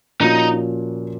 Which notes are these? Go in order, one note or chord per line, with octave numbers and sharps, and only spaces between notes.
A#2 F3 A#3 C#4 D#4 F#4